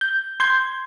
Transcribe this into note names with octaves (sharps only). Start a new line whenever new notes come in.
G6
C6 G6 G#6